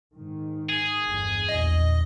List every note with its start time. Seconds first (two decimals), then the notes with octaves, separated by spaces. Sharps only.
0.14 G#2 D#3
0.69 G#4
1.04 G1 E2 G2
1.49 A#1 E2 A#2 D#5